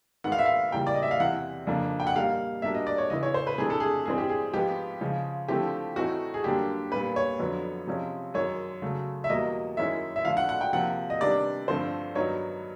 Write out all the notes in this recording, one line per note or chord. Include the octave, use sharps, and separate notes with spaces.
G#2 D#3 G#3 B3 F#5
F5
E5
F5
C#3 E3 G3 A#3 G5
D5
D#5
E5
F5
E2 C3 E3 F#5
F2 C#3 F3 A#3 D4
G5
F#5
A#2 G3 A#3 D#4 F5
B2 G3 A#3 D4 E5
D#5
D5
C#5
C#3 E3 G#3 B3 E4 D#5
C#5
C5
B4
C3 E3 A3 D4 G#4
A4
G#4
G2 E3 G#3 C4 G#4
G4
G#4
G#2 F3 G#3 B3 G4
C#3 F3 G#3
D3 F3 A3 C4 E4 G4
A2 E3 A3 C4 D#4 F#4
G#4
F#2 D3 G3 A#3 D4 G4
A#2 G3 B3 B4
C#5
F2 D3 F#3 B3
C3 F3 G#3 C#4
F#2 D#3 G#3 C#5
C#3 F#3 A3
E5
E2 B2 G3 A#3 D#5
F#2 D#3 G#3 C#4 E4 E5
E5
D3 F3 A3 F5
F#5
F#5
G5
C3 F3 A#3 F#5
D#5
C3 D#3 G3 B3 D4 D5
G2 D3 F3 A3 C4 C5
G2 D#3 F#3 B3 D#4 C#5